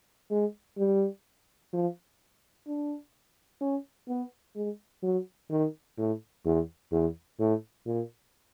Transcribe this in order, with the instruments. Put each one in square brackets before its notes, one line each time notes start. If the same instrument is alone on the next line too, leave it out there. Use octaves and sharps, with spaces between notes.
[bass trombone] G#3
G3
F3
D4
C#4
B3
G#3
F#3
D#3
A2
E2
E2
A2
A#2